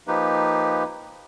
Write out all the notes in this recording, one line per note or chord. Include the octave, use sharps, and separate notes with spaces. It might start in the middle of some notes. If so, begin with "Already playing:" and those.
F3 A#3 D#4 G4 B4